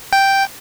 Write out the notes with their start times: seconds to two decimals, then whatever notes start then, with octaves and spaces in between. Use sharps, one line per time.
0.13 G5